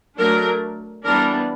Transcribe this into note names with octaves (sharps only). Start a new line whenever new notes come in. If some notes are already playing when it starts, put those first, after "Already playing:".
F#3 A3 D4 A#4
E3 G3 B3 D4 A#4